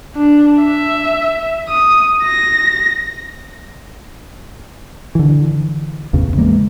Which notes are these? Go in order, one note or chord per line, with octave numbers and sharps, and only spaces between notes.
D4
E5
D#6
A#6
D3 E3
A1 E2 C#3
E3 G#3 A#3